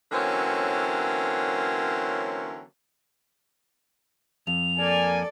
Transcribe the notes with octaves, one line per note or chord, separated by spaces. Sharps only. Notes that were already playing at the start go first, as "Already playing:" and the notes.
D3 E3 F#3 A#3 C4 C#4
F2 F7
A#3 A4 D5 G#5